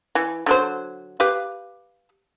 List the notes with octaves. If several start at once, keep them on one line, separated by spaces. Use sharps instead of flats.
E3
D3 F#3 C5
G4 B4 F5